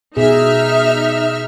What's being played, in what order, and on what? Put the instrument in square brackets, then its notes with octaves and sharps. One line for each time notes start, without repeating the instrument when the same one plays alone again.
[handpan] B2 G#4 [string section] D#4 E5 F6